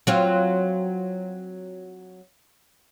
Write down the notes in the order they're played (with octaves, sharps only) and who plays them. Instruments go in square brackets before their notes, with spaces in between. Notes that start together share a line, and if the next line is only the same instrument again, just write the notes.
[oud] F#3 C4 F4